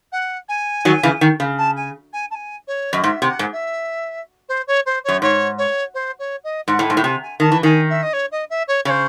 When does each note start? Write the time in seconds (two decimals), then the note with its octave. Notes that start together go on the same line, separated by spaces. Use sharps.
0.12 F#5
0.48 G#5
0.85 D#3 F#3
1.03 C#3 E3
1.21 D#3
1.40 C#3
1.58 A5
1.76 G#5
2.13 G#5
2.30 A5
2.34 G#5
2.67 C#5
2.92 F#2 D#5
3.03 G#2 E5
3.22 C3
3.28 F#5
3.39 G#2
3.52 E5
4.48 C5
4.67 C#5
4.86 C5
5.04 F#2 C#5
5.22 G#2 C#5
5.58 C#5
5.94 C5
6.19 C#5
6.44 D#5
6.68 G#2 F#5
6.79 A2 A5
6.85 G#2 G#5
6.97 A2
7.03 C3 G#5
7.22 G#5
7.40 D#3 A5
7.52 E3
7.63 D#3 G#5
7.89 E5
8.02 D#5
8.13 C#5
8.31 D#5
8.50 E5
8.67 C#5
8.85 C#3 C#5
8.90 C5